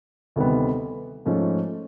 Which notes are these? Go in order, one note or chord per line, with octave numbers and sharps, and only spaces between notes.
D2 C3 D#3 G3 B3
G#2 F3 A3 C#4